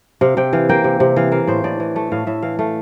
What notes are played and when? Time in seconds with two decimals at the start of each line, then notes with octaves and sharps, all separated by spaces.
0.21 C3 F5
0.37 C3 G5
0.53 E3 F5
0.69 A#3 G5
0.84 C3
1.00 C3
1.16 E3 F5
1.32 A#3 F5
1.47 A2 C5
1.64 A2 D5
1.80 E3
1.96 A3
2.12 A2 F5
2.27 A2 E5
2.42 E3 F5
2.59 A3 F5